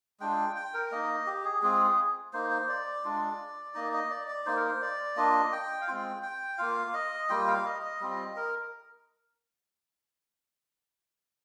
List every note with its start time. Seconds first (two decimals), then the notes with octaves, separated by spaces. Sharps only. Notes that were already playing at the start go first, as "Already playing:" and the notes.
0.20 G#3 D4 F4 G5
0.56 G5
0.74 A#4
0.92 A#3 D#4 D#5
1.26 G4
1.45 G#4
1.62 G#3 C4 F4 G#4
2.33 A#3 D#4 C5
2.51 C5
2.69 D5
3.05 G#3 D4 F4
3.75 A#3 D#4 D#5
3.93 D#5
4.11 D5
4.28 D5
4.46 A#3 D#4 C5
4.56 A#4
4.68 C5
4.82 D5
5.16 A#3 D4 F4 D#5
5.52 G5
5.81 F5
5.88 G#3 C4 F4 G5
6.23 G5
6.58 A#3 F4 F5
6.94 D#5
7.29 G3 A#3 F4 G5
7.47 F5
7.65 D#5
7.82 D#5
8.01 G3 C4 F4
8.36 A#4